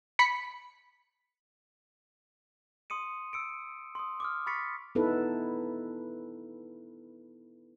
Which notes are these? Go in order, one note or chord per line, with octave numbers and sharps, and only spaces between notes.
B5 B6 C#7
C6 D#6 C#7 D#7
E6 C#7 D7
C6 D#6
D6 D#6 F6
B5 C#6 A6 B6 C#7
B3 D#4 E4 A4 B4